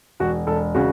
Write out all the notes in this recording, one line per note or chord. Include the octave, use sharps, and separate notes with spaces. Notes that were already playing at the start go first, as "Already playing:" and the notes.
E1 F#4
E1 A4
C#3 F#4